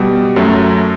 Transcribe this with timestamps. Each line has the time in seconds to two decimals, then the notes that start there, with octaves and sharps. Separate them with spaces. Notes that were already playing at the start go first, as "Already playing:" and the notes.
Already playing: B2 G3
0.36 F#2 F#3 A3